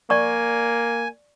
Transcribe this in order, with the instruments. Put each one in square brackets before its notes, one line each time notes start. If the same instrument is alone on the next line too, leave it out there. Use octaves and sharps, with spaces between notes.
[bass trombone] A#3 [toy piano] D5 C#6 [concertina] G#5